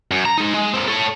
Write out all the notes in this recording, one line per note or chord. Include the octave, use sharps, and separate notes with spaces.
F#2
A#5
G#3 D#4
G#3
A#3 C4
A4 C#5